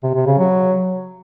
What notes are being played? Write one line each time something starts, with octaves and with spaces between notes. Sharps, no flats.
C3
C3
C#3
F#3